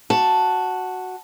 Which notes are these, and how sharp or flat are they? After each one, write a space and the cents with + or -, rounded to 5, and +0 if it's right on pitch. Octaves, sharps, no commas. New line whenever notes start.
F#4 +0 A5 +0